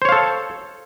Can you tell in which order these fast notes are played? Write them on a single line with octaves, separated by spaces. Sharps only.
C5 C#5 F5 A4